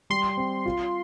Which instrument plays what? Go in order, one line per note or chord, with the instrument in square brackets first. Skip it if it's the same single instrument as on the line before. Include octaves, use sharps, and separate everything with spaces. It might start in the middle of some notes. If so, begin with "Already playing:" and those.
[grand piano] G3 [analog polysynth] C6
[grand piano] C4
F4